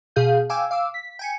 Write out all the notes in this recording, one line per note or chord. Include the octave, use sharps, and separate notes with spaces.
B2 G#4 F5 G6
F5 G5 G#5 D6 E6
F5 D6 E6
B6
G5 G#5 C#7